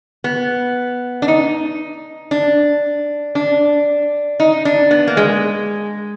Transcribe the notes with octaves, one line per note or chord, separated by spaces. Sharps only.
B3
D4
D#4
D4
D4
D#4
D4
B3
A#3
G#3